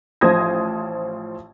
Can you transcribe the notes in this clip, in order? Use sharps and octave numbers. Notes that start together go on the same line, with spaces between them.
A1 F3 C5 D#6 G#6 A#6